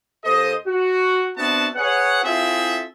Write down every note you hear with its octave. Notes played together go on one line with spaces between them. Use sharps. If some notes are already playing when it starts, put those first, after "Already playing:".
D#2 A4 C5 D#5
F#4
B3 C4 D4 F#4 E5 A5
G#4 B4 C#5 F#5
C4 E4 F4 G#4 A4 E5